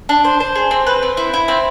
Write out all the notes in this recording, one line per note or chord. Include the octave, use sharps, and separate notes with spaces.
D4
C5
C5
G#4
C4
B4
C4
E4
E4
C4